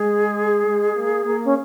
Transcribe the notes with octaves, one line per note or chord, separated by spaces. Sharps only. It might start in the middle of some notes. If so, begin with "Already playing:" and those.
Already playing: G#3 G#4
G#3
A#3
A#3
C#4